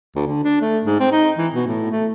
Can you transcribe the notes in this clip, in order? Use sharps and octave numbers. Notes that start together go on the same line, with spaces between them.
D2
D3
D4
A3
G#2
C4
D#4
E3
B2
A2
A3